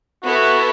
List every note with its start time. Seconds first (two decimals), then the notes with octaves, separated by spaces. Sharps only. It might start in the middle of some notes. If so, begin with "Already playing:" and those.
0.24 B3 E4 F#4 A4